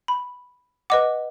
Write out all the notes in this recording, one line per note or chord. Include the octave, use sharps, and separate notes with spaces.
B5
B4 D#5 F#5 D6